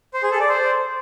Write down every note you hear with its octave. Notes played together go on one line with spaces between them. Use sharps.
C5
G#4
A4
D5
C5